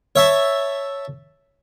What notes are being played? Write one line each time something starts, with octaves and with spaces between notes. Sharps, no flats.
C#5 E5 A5